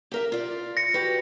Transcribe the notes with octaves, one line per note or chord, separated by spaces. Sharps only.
G4 A#4 E5
F4 D5
A#6 C#7
F#4 G4 B4